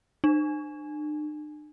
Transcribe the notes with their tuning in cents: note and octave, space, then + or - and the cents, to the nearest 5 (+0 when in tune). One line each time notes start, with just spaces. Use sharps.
D4 +45